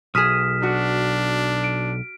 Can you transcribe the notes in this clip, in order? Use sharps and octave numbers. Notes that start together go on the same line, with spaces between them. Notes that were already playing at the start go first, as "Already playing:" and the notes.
B1 G#4 D#6 F6 B6 E7
D4 F#4
D7